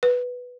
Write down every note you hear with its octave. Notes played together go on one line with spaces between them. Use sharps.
B4